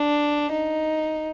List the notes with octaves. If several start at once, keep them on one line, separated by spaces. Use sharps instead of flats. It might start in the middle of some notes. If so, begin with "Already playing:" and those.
Already playing: D4
D#4